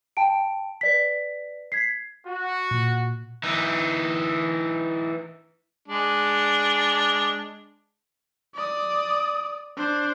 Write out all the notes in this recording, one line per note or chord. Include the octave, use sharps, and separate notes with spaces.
G5 A5 D7
B4 D5 B6
G#6 B6 C7
F#4
A#2
E3 D#4
G#3 D4
D5 D#6
D4 C5